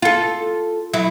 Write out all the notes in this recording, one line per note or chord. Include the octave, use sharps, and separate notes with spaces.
F4 A4
F#3 E4